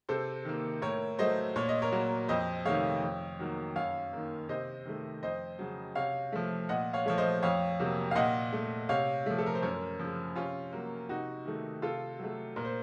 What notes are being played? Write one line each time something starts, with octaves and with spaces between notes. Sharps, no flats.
C3 A4 C5
D#3 A#3
A2 A#4 C#5
F#3 A3 C5 D#5
A#2 C#5
D#5
A#4 C#5
F#3 A#3
F2 C5 D#5
C3 D#3 A3 C#5 F5
F2
D#3 F#3 A#3
F#2 C#5 F5
D#3 A#3
C3 C5 D#5
D#3 A3
F2 C5 D#5
C#3 F#3
C3 C#5 F5
F3 A3
A#2 D#5 F#5
C#5 F5
F3 A3 C#5
C5 D#5
F2 C#5 F5
C3 F#3 A#3
F5
A#2 D#5 F#5
A3
C3 C#5 F5
F3 A3
A4
A#4
C5
F#2 A#4 C#5
C#3 F3
C3 C#4 F4
F#3 A#3
C3 D#4 F#4
D#3 A3
C3 F4 A4
F#3 A3
A#2 A#4
C5